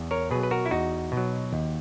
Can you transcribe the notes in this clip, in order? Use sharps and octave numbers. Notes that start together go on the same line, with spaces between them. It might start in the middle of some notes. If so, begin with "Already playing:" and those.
Already playing: E2
A#4 C#5
B2 F#3 G#4 B4
B4
F#4 A#4
E4
E2 D#4 F#4
B2
F#3
D#2